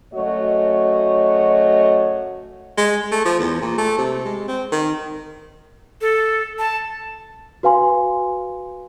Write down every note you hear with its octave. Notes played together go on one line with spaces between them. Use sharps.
F#2 A3 F#4 C#5 D#5
G#3
A3
F3
E2
A#2
A3
C3
G#3
C4
D#3
A4
A5
F#4 B4 F5 G#5 C6